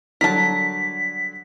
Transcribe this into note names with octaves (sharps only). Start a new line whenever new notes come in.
D3 F#3 G3 A#4 A5 B6